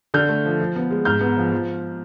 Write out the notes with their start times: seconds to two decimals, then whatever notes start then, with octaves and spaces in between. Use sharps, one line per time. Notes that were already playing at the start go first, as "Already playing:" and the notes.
0.14 D3 F6 G6
0.29 A3
0.45 F3
0.60 F3
0.76 B3
0.91 G#3
1.05 G#2 F6 G6
1.21 B3
1.37 F3
1.52 F3